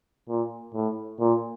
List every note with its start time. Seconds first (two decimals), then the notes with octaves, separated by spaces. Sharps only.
0.29 A#2
0.74 A2
1.20 A#2